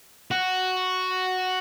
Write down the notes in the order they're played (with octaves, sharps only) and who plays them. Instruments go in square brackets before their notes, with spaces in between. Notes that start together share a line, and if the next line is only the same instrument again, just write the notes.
[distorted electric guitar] F#4